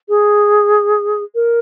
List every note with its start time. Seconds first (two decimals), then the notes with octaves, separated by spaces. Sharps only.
0.09 G#4
1.35 A#4